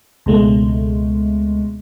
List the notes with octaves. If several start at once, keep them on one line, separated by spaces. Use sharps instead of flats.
C#2 B2 G#3 A3